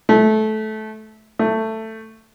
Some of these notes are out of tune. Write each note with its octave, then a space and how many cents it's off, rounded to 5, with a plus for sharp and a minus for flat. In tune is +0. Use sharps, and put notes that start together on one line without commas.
A3 -20
A3 +10